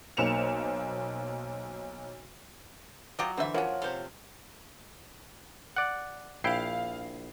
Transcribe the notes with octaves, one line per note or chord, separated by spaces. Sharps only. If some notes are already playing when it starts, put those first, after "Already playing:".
B1 A#3 C5 C#7 E7 F7
F#3 F4 G4 D#5
D3 E3 C5 E5
F3 F#3 C#4 F4 A#4 C#5 F#5
C3 A4 C5 F5
D5 F#5
A#1 E4 F5 G5 C7